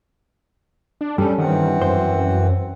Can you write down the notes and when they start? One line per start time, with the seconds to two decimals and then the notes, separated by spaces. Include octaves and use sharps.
1.01 D4
1.18 G2 G3 C#4 A4
1.38 D#3 E3 C4 F#5
1.82 F#2 C5